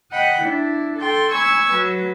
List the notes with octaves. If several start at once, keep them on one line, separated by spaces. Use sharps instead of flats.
D#5 F#5 G5 B5
D4 E4
A4 G5 C6
G#5 B5 C#6 E6 G#6
F#3 B4